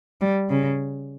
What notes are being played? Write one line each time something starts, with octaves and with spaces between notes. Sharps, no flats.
G3
C#3